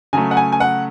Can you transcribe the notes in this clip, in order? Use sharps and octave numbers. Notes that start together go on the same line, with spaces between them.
C#3 F#3 A3 G#5
F#5
G#5
G#5
F#5